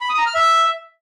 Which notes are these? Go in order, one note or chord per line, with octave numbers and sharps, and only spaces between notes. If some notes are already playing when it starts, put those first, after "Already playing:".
B5
D#6
A#5
F6
E5